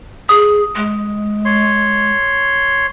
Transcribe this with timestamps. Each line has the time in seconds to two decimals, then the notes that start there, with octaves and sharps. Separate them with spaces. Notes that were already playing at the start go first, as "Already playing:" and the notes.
0.29 G#4 D#6
0.76 G#3
1.45 C#5 C6